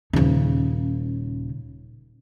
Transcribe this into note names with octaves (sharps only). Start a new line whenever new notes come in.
D#1 C#3